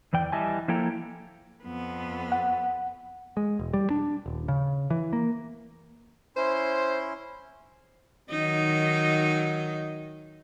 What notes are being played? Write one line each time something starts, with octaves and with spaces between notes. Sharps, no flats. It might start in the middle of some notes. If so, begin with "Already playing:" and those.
E2 E3 D5 G5
E3 G3 D#5 E5 G#5 A5
F3 A#3 E4 A4 G5 A#5
F2 B3
F#5
G#3
E1
G3
D4
D#1
C#3
E3
A#3
C#4 E4 C5 C6
D#3 F#3 D#4